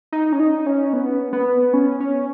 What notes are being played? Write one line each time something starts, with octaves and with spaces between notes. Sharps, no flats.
D#4
C#4
D#4
C#4
B3
B3
C#4
C#4